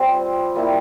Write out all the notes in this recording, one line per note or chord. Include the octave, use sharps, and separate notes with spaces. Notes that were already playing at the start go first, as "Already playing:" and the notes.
Already playing: G3 C4 F4
G3 A#3 E4